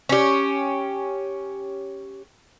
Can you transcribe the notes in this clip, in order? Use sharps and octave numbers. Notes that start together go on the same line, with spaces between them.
C#4 G4